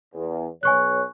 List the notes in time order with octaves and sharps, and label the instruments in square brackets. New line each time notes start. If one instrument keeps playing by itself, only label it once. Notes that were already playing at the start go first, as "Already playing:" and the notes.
[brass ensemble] E2
[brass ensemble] B1 C#5 [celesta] G#5 C#6 F#6